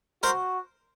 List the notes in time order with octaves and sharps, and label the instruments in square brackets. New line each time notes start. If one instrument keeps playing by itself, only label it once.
[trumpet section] F#4 [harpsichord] A#4 C5